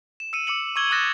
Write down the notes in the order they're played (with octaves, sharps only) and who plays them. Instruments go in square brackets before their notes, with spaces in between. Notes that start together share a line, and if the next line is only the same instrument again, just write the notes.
[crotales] E7
E6 C#7 D#7
D6 E6 C#7 F#7
C#6 D6 E6 G#6 F#7 G7
D6 D#6 F#6 A6 A#6 E7